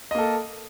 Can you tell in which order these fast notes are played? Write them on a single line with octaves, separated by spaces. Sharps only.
D#5 A#3 A4